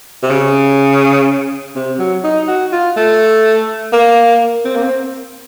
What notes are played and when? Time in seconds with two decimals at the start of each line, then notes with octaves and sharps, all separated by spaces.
0.23 C3
0.30 C#3
1.76 C3
1.99 F#3
2.24 D#4
2.48 F#4
2.72 F4
2.97 A3
3.93 A#3
4.65 C4
4.76 A#3
4.84 C4